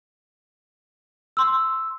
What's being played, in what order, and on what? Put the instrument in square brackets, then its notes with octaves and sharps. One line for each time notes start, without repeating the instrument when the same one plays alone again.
[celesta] C6 E6